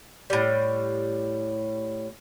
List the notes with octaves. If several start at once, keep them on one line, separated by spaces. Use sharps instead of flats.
A2 G3